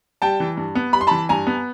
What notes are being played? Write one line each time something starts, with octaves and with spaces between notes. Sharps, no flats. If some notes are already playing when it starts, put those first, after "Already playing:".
G3 G5 A5
E3
G2
B3
G3 B5
C6
E3 A5 B5
G2 G#5 A#5
B3